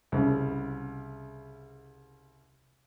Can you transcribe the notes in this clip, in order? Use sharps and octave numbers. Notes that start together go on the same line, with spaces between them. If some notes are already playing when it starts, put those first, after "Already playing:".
C2 C#3